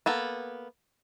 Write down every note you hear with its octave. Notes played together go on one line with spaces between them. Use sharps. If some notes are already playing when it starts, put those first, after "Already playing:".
A#3 B3 A4